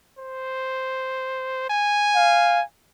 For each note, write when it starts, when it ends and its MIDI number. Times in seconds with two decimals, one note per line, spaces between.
0.18 1.68 72
1.70 2.63 80
2.15 2.62 77